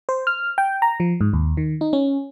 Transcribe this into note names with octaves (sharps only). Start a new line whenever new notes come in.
C5
F6
G5
A#5
F3
G#2
D#2
D#3
D#4
C#4